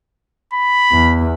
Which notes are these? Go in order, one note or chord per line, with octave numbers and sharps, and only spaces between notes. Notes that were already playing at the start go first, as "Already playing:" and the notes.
B5
E2